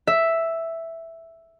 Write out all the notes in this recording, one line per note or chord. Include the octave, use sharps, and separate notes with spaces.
E5